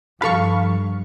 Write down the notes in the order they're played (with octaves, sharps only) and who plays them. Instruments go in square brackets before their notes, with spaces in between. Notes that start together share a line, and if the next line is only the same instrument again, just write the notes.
[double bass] G2 [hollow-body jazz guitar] F3 A4 B5 [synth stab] F5 C#6